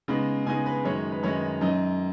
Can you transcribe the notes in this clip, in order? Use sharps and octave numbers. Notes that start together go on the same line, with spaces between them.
C#3 G#3 B3 D#4 B5
C#3 G#3 B3 D#4 G#5
B4
F#2 D#3 G#3 D#4 C#5
B4
F#2 D#3 G#3 D#4 C#5
F#2 F#3 D#4 D#5